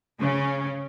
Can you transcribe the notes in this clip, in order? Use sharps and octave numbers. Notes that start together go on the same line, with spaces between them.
C#3 C#4